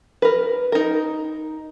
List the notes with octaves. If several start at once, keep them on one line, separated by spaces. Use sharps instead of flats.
A#4 B4
D#4 A#4